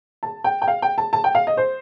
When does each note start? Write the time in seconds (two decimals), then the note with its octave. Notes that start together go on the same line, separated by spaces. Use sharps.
0.23 A5
0.44 G5
0.62 G5
0.68 F5
0.82 G5
0.98 A5
1.13 A5
1.24 G5
1.35 F5
1.47 D#5
1.57 C5